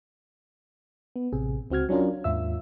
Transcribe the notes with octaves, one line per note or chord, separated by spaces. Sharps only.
B3
A1 C3 G#4
C#2 C4 F#4 F6 G#6
F#3 C#4 D4 F4 A#4
D#2 G#2 F4 E5 E6